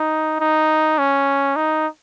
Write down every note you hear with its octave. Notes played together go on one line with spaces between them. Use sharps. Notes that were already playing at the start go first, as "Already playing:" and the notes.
Already playing: D#4
D#4
C#4
D#4